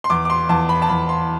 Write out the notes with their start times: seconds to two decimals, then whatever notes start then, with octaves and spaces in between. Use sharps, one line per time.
0.04 C6
0.10 E2 D6
0.25 D6
0.30 C6
0.49 E2 A5
0.69 B5
0.82 A5
0.89 E2 B5
1.09 C6